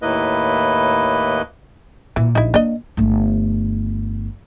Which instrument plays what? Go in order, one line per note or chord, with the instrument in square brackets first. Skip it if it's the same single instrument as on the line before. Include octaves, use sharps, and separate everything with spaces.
[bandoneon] D#2 A2 A#3 E4 B4 D#5
[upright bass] A#2 [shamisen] E3
[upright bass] A#1 [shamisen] D#4 E4
[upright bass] A#3 [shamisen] D4 D#5
[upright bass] G1 A3